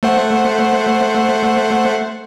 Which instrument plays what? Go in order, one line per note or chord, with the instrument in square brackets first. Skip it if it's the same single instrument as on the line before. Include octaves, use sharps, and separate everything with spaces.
[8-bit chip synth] A3 C5 F#5